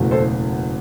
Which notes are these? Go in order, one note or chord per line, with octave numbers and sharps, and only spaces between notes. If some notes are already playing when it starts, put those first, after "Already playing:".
Already playing: F#1 E2 B2 A3
A4 C5